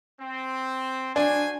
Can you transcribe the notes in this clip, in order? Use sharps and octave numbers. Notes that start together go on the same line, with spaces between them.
C4
D4 F#4 C5 G#5